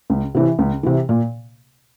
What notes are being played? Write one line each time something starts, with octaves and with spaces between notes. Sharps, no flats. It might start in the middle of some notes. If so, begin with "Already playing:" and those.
C#2
C3 E3
C#2
C3 E3
A#2